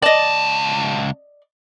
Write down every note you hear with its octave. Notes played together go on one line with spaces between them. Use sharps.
C#2 D5 D#5 A5